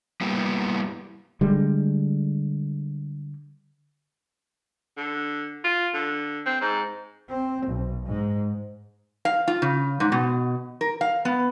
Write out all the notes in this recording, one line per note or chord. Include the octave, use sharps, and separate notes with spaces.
G3 A#3 B3 E4 G4
D3 G3 G#3
D3
F4
D3
C4
G#2
C4
B1
G#2
F5
F4
C#3
G#2
B2
A#4
F5
B3